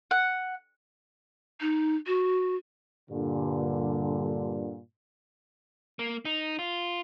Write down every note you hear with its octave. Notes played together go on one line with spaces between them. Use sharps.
F#5
D#4
F#4
G2 A#2 D3
A#3
D#4
F4